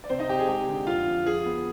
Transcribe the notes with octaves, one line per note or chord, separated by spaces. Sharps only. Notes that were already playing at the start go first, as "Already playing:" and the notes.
D5
C3 C4 C5
D#4 D#5
C3 G4 G5
G#4 G#5
G#3 G4 G5
D3
F2 F4 F5
F2
F3 G#4
B3